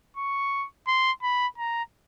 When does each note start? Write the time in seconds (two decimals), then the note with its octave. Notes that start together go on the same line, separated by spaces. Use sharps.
0.17 C#6
0.87 C6
1.22 B5
1.58 A#5